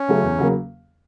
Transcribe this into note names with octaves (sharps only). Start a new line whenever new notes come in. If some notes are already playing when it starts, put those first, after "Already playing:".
Already playing: C#4
C#3 F#3 A3
E2
C#3 F#3 A#3